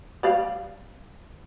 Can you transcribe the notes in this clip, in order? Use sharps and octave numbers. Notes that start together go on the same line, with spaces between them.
G3 D5 F5